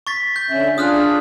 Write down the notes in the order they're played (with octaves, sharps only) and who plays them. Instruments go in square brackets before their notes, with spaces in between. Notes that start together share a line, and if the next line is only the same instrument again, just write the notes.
[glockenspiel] C#6 A6 B6
G6
[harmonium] D3 C#4 E5
[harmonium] D4 F4 G#4 [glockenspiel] D#6 F6 F#6